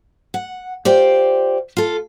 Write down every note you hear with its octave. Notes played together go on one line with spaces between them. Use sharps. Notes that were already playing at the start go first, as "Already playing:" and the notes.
F#5
F4 G4 C5 D5
F4 A4